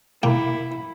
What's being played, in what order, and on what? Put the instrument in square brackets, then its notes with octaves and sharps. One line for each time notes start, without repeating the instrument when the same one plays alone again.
[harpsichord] A#3 G5 [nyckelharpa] E4